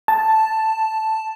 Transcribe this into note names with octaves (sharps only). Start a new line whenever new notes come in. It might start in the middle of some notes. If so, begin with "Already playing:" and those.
A5